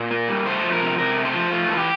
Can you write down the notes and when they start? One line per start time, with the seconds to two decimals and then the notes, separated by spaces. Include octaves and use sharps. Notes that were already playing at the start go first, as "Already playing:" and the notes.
Already playing: A#2
0.11 A#3
0.28 G3
0.46 A3 C5
0.63 F3
0.73 A#4
0.81 C3
0.98 C3 A#4
1.17 A3
1.25 C5
1.34 F3
1.51 A3 F4
1.69 E3 A4
1.78 G4